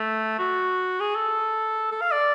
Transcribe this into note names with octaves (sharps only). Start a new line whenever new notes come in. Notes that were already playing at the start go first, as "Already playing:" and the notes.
Already playing: A3
F#4
G#4
A4
A4
F5
D5